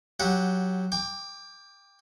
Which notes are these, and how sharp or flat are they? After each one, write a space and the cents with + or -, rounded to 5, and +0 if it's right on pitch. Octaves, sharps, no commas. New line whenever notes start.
F#3 +0 G4 +0 F#5 -15
G5 +25 D6 +0